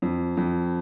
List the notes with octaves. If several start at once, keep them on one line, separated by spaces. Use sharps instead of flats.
F2
F2